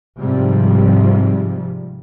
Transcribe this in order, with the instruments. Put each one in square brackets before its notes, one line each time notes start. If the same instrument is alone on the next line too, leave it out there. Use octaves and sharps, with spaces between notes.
[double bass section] G#2 C3 F3 G3